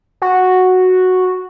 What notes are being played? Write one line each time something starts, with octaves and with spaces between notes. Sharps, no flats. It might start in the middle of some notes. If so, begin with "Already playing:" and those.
F#4